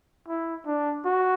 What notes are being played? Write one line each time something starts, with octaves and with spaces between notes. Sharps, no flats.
E4
D4
F#4